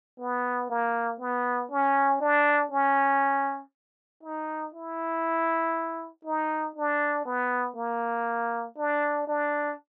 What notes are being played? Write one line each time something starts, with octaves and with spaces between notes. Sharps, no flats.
B3
A#3
B3
C#4
D4
C#4
D#4
E4
D#4
D4
B3
A#3
D4
D4